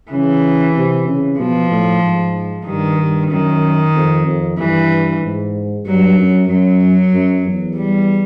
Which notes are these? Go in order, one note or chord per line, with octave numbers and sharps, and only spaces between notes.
C#3 E3
C3
C#3
B2 F3
A2
G#2
G2 D#3
G2
F#2 D#3
F2
F2
G2 E3
G#2
G2 F#3
F#2
F#2 F#3
F#2
E2
G3